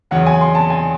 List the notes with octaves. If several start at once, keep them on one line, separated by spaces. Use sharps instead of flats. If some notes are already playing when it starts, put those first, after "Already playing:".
E2 C#3 F#3 C#4 F#5
G#5
C6
A5
G#5